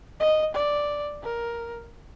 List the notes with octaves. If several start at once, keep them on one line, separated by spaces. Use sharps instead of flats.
D#5
D5
A#4